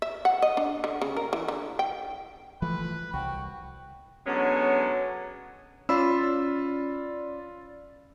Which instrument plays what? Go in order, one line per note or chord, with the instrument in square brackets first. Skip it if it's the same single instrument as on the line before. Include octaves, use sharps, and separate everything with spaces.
[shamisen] E5
F#5
D#5
D4
D3
C#3
A#4
E3
D3
G5
[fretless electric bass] E3 F3 A3 [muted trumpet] B4
[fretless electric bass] C2 [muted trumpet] F#4 [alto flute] G5
[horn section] D3 F#3 G#3 B3 C#4
[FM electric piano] C#4 D5 A6 [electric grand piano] F4 B5 E6